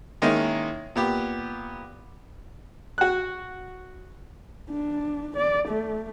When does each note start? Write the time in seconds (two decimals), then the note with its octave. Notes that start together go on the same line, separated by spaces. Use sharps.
0.22 D#3 G#3 A#3 C#4 D#4 E4
0.96 A#2 B3 G4
2.98 F#4 F#6
4.70 D4
5.37 D5
5.69 A3